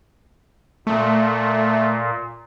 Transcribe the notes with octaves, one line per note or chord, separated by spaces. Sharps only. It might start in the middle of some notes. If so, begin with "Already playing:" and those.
A#2 A3